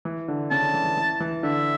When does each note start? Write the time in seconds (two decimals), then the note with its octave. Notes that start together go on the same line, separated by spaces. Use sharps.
0.05 E3
0.28 D3
0.51 C#3 A5
0.62 D3
0.74 E3
0.85 E3
0.97 E3
1.20 E3
1.43 D3 E5